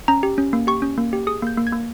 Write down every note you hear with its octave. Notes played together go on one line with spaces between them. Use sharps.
C#4 A#5
G4
C#4
A#3
G4 C#6
C#4
A#3
G4
G#4 D#6
A#3 G6
A#3
G#6
A#3